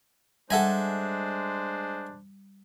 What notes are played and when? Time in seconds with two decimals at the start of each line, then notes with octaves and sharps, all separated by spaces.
0.51 G3 G#3 D4 A4 C5 E5 F#5 G#5